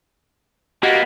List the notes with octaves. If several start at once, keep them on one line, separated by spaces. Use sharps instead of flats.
A#3 B3 F#4 G4 D#5 F#5